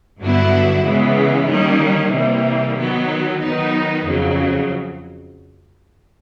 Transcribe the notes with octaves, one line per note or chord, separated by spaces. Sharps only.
G2 D3 F#3 B3 E4
C#3 E3 G#3 B3
D#3 G3 A#3 C#4
C3 E3 G3 A#3
D#3 F#3 B3
D#3 F#3 B3 D#4
F2 C#3 F#3